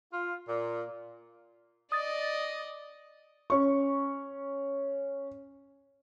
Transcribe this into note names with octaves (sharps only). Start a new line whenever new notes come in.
F4
A#2
D5 D#5 D#6 A6
C#4 C#6